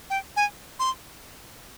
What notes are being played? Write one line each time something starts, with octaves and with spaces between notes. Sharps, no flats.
G5
G#5
C6